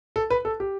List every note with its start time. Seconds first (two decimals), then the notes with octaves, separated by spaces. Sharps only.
0.16 A4
0.30 B4
0.45 A4
0.60 G4